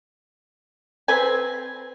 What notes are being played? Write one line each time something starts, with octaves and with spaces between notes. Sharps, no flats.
C4 B4 G#5